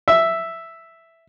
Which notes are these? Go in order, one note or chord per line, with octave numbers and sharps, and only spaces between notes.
E5